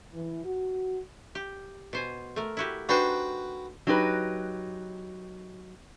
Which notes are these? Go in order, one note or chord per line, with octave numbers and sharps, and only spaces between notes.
E3
F#4
G4
B2 C5 G#5
A3 A#4
E4 F#4 G4
D4 D#4 F#4 B4 C5 G5
F#3 D#4 G4 B4